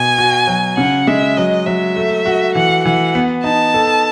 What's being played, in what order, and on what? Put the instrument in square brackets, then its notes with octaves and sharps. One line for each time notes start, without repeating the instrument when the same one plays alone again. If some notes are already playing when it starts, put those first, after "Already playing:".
Already playing: [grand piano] B2 [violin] G#5
[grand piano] F#4
F#3
[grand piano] C#3 [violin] F#5
[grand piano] G#3 [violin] E5
[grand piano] F#3 [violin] D#5
[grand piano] F#3 [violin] E5
[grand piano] A3
F#4
[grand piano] E3 [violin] F#5
[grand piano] E3 [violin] F#5
[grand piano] B3
[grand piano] D#4 [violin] A5
[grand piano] A4